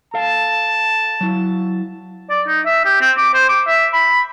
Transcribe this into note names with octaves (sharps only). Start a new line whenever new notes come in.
A4 F5 A5
F#3 E4
D5
D#4
E5
G4
C4
D6
C5
D6
E5
B5